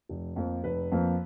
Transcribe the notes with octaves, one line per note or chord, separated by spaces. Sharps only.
F1
F2 F3 A#3
F1 B4
F2 F3 A#3